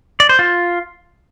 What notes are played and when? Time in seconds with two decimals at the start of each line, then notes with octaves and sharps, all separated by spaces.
0.20 D5
0.29 C5
0.39 F4